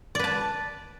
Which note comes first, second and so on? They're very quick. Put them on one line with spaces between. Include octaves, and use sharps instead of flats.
D5 B4 A5